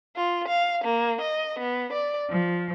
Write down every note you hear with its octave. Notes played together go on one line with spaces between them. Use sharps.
F4
F5
A#3
D#5
B3
D5
F3